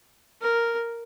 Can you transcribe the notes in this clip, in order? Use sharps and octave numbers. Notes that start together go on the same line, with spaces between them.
A#4